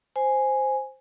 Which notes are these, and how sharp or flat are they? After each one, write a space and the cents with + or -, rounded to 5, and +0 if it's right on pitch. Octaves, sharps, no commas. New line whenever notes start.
C5 +0 G#5 +0